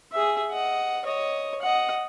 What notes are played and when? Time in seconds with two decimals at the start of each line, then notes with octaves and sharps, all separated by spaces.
0.12 G#4 E5
0.52 D#5 F#5
1.05 C#5 D#5
1.62 D#5 F#5